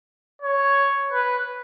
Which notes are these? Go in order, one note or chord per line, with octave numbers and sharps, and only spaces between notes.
C#5
B4